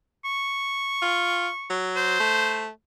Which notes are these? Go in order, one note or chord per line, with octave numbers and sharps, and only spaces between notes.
C#6
F4
F#3
C5
A3